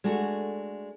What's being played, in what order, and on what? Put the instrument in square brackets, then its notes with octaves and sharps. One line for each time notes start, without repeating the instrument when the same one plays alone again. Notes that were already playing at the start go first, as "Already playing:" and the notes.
[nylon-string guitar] G#3 A3 D4 F#4